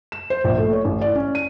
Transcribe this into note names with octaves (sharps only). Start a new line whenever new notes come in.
E7
C5
A#1
A3
C#5
A1
D5
C#4
D#7